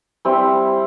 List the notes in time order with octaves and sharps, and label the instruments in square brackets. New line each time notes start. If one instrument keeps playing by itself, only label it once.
[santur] G3 C4 E4